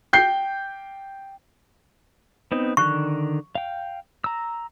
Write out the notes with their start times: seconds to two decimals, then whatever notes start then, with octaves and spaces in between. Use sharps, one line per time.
0.13 G5 G6 C7
2.52 B3 C4 D#4
2.77 D3 D#3 C#6 F#6
3.55 F5 G5
4.24 A#5 E6